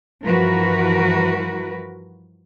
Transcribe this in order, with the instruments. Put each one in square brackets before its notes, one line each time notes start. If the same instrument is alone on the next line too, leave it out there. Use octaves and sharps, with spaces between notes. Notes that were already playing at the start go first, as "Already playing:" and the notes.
[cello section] G2 E3 F3 F#4 A#4 B4